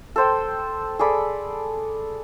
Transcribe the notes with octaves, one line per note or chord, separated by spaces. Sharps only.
A4 C5 G5
G#4 A4 D5 B5